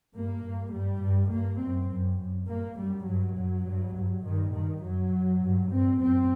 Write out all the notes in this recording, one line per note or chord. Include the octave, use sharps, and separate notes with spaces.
G2 A#3
G2
G2 G3
G2
G2 A#3
F#2 C4
F#2
F#2
G2 A#3
F#2 G3
G2 F#3
F#2
G2
G2
G2 D#3
G2 D#3
F#2 F#3
F#2
G2
G2 C4
F#2 C4